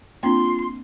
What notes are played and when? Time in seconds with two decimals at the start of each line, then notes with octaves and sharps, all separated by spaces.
0.23 A#3 C4 D4 F4 C6